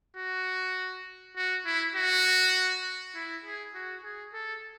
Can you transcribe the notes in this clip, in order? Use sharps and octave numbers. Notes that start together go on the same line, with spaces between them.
F#4
F#4
E4
F#4
E4
G#4
F#4
G#4
A4